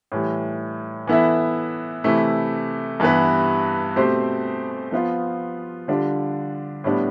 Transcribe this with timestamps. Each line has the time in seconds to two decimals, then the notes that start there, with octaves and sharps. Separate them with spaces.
0.12 A2 E3 G3
1.07 E3 B3 E4 A4 E5
2.04 C3 E3 A3 E4
3.00 G2 E3 B3 E4 B4
3.96 B2 A3 C4 G4 C5
4.92 F3 B3 F4
5.88 D3 G3 D4 F4
6.84 A2 G3 B3 D4